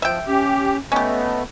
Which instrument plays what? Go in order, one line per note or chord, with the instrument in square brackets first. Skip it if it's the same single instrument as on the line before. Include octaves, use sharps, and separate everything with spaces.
[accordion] F3 [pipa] E5 G5
[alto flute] C#4 [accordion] G4
[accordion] A3 B3 [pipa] C#4 G4 [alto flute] D#5